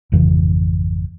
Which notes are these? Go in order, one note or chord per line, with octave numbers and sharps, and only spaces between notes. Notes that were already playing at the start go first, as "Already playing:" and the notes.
G#1 F2 C#3 E3